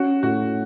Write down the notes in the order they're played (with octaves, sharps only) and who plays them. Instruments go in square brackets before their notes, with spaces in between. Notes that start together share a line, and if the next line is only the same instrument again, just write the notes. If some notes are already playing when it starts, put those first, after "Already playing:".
Already playing: [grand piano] C#4 [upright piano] F#4
[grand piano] A2 [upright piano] F#4